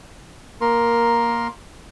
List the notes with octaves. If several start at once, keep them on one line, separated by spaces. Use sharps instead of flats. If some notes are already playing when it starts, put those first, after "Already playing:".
A#3 A#4 C6